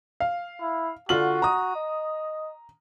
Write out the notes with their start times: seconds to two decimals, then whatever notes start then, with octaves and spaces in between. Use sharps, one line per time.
0.20 F5
0.61 E4
1.09 D3 F4 F#4 F#7
1.42 A#5 D#6
1.76 D#5